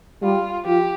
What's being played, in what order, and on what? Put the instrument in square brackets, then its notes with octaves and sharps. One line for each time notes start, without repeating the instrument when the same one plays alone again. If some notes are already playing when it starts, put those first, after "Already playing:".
[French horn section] G3 G4 [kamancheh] F4
[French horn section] F3 F4 [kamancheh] G4